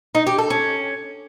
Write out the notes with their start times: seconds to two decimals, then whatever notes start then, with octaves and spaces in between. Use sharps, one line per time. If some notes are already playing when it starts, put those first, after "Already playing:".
0.15 D#4
0.27 G4
0.38 A4
0.50 C#4